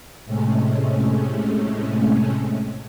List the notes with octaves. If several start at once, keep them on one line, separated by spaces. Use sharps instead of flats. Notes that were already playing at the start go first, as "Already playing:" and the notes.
A2 C3 G#3 A3 C#4